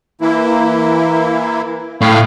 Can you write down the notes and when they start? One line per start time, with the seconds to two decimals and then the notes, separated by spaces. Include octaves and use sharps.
0.21 E3 A#3 E4
2.01 A2 F5